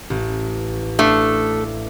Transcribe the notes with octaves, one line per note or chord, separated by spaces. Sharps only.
A1
A3 D4 E5 F5